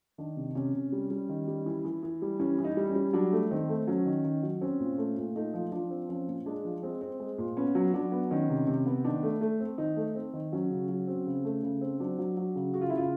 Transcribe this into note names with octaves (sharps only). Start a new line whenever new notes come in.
D#3 D4
C3
C3 C#4
C3
G3
G3
D#3
G3
E3
E3
E3
G3
E3 C#4
E3
D#4
G3
C#4
G3
F#3 D4
A3
D#3 C4
A3
F#3 C#4
D#3
D#3
F#3
C4 C#4
A#2
A3
A#2
A3 D#4
F3
F3 D4
C4
F3 C#4
A#2
G#3 D4
F3
G#3 C4
C4
G#3
A#2
B3 C#4
F#3
F#3 D4
B3
D#3 C#4
C3
C3
B3
D#3 D4
A3
A3
C4
D#3 D#4
A3
C4
D#3
F#3 C#4
C#3
F#3
C4
C#3
A3
C#3
C4
F#3 D4
F#3
F#3
C#3
C#3 F#4
F4
C#3 E4
F4